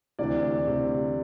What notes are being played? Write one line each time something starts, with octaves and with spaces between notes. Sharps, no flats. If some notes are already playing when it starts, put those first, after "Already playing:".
D2 C3 E3 D5
D2 C3 E3